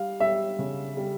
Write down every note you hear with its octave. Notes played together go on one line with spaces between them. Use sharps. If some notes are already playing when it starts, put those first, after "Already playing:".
Already playing: G3 F5
G3 E5
C#3
G3